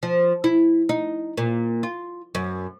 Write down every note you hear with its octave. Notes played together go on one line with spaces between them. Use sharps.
F3
E4
D#4
A#2
F4
F#2